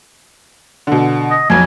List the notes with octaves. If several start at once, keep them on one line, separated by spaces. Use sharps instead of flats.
B2 D3
D#5
B1 F2 G#5